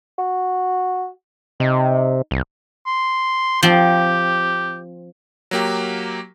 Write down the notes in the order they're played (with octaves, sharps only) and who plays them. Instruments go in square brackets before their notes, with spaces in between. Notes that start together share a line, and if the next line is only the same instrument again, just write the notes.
[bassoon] F#4
[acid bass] C3 [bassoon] D#4
[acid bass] C2
[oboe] C6
[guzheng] F3 C4 [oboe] G4
[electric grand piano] F#3 A#3 G4